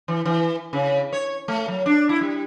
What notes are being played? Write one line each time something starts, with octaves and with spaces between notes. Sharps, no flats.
E3
E3
C#3
C#5
A3
F#3
D4
E4
G3